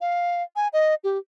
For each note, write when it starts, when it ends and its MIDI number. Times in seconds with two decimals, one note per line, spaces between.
0.01 0.43 77
0.56 0.68 80
0.73 0.95 75
1.04 1.18 67